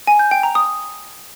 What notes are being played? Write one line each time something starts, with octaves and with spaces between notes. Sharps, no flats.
G#5
G6
G5
A#5
D#6